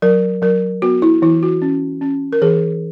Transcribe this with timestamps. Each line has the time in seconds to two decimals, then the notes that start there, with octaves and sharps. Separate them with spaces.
0.02 F#3 A#4
0.42 F#3 A#4
0.82 B3 F#4
1.02 E4
1.22 E3 E4
1.43 F#4
1.62 C#4
2.01 C#4
2.33 A#4
2.42 E3 G#4